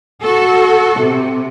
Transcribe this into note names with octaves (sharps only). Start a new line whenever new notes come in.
F#4 A4
C3